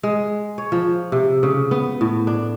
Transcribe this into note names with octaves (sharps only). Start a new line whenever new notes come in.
G#3
C#5
F3
C3
C#3
B3
A2
D4